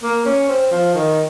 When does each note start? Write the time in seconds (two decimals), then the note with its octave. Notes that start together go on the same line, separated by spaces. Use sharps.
0.03 A#3
0.26 C#4
0.49 C4
0.72 F3
0.95 D#3